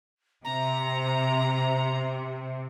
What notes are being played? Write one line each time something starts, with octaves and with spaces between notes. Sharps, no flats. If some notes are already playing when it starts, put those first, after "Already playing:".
C3 A#5